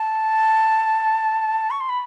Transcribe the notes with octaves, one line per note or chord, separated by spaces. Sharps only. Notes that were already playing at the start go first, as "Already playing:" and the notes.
Already playing: A5
C#6
C6
B5